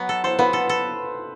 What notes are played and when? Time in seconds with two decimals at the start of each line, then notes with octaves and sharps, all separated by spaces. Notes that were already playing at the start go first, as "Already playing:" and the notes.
Already playing: F#3 B3
0.09 A4
0.24 A4 C5 C6
0.39 B3 B4 B5
0.53 A4
0.69 A4